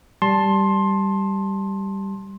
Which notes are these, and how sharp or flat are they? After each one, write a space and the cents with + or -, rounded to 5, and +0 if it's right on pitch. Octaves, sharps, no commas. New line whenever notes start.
G3 +0 A5 +0 C6 +15